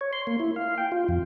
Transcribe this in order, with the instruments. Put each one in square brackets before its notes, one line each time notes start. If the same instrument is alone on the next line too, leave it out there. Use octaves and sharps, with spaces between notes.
[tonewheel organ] C#5
C6
A#3
E4
F5
G5
F4
F2